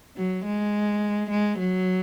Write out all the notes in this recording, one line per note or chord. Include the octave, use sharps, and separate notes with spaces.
F#3
G#3
G#3
F#3